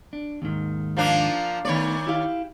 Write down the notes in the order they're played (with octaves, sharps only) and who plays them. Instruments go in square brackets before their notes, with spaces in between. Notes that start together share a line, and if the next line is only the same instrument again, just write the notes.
[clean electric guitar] D4
D#2 G#2 D#3
[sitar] F3 A#3 D4
[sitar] D#3 C#5 D5 [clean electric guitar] A3 B3
[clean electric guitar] E4 G4 F5